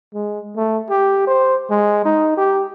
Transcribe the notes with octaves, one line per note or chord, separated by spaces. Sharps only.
G#3
A3
G4
C5
G#3
D#4
G4